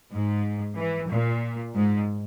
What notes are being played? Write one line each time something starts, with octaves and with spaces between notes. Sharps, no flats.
G#2
E3
A#2
G#2